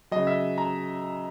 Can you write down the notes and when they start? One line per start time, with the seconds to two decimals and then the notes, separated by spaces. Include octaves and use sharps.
0.11 C#3 F#3 D#5
0.27 E5
0.58 A#5